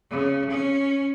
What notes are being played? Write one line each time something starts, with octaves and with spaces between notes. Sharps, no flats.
C#3
C#4